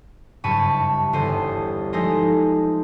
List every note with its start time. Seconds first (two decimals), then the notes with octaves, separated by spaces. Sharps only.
0.44 F#1 G2 A5 B5 C#6 D#7
1.13 G1 E2 C5 D#7
1.93 F3 G#3 A3 D#4 C5 D#5